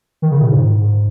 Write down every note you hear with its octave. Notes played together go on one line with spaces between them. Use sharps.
D#3
C#3
A#2
G#2